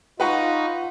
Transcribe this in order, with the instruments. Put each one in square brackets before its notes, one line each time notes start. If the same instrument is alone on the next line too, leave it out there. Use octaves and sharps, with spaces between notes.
[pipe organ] D#4 [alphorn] F4 [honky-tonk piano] B4 F#5 C#6